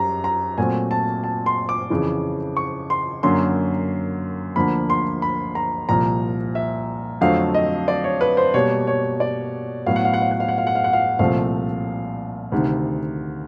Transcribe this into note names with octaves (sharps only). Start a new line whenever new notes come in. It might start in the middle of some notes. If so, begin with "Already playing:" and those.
Already playing: F#2 G3 A#5
A#5
A#2 F#3 A3 C4 G#5
A5
A5
C6
D6
F2 C#3 E3
C#6
C6
F#2 D3 F#3 A#3 C6
D2 D3 F3 A#3 B5
C6
B5
A#5
C2 A#2 F3 A#5
E5
F2 D3 F#3 A3 C4 F5
D#5
D5
C#5
B4
C5
B2 G3 A#3 C#5
C#5
D5
A2 F#3 B3 F5
F#5
F5
F#5
F5
F#5
F5
F#5
F5
F#5
F5
F#5
F5
C2 A#2 F3 A3 C4 F5
D2 C3 D#3